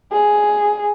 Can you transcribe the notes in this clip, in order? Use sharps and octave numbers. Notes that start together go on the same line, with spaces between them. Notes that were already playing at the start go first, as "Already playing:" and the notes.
G#4